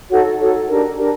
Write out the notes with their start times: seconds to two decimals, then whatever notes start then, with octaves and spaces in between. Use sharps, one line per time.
0.10 D#4 F#4 A4 C#5
0.39 D#4 F#4 A4 C#5
0.69 D4 G4 A#4
0.98 D4 G4 A#4